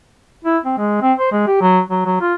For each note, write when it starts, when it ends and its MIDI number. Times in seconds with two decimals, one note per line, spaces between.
0.44 0.58 64
0.65 0.77 60
0.78 0.98 56
1.02 1.13 60
1.19 1.31 72
1.32 1.46 56
1.47 1.59 67
1.61 1.81 54
1.90 2.01 54
2.06 2.18 54
2.21 2.34 65